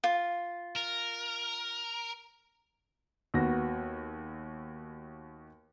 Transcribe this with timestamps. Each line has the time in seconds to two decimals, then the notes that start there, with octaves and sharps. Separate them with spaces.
0.04 F4
0.75 A#4
3.34 D#2 B3 F#4 A#6